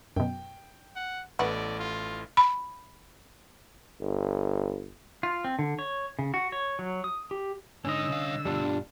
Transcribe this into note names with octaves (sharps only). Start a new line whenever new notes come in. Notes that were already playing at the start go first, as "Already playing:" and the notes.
F#2 B2 G5
F#5
A1 A3 B3 F#4 D5
F4
B5
G1
F4
C4
D3
C#5
C#3
F#4
C#5
F#3
D#6
G4
G#2 D3 C#4 D#4 D#5 E6
C2 F5
G2 B2 G3 D4 F4